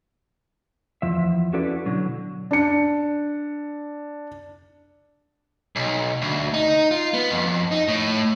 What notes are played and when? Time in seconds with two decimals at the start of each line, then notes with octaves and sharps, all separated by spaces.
1.02 E2 F3 E5
1.53 C#4 E4 F#4 A4 B4 D5
1.86 B2 D3 F#3
2.51 D4 C#7
5.76 B1
6.22 D2
6.54 D#4
6.91 F4
7.14 B3
7.31 F2
7.71 D#4
7.88 A2